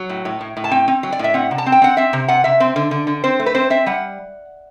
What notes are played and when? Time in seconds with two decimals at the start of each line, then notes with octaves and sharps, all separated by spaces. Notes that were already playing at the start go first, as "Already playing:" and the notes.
Already playing: F#3
0.09 A2
0.25 A2
0.41 A2
0.57 A2
0.64 A5
0.71 C4 G5
0.88 C4
1.03 F#3
1.13 D5
1.19 A2 E5
1.34 C4 F#5
1.51 C3
1.58 A5
1.66 C4
1.72 G5
1.82 C4 F#5
1.97 C4 E5
2.13 C3
2.28 C3 F#5
2.44 C3 E5
2.60 C4
2.76 D3
2.91 D3
3.07 D3
3.24 C4 C5
3.40 A3
3.46 B4
3.54 C4 C5
3.70 C4 E5
3.86 G3 F#5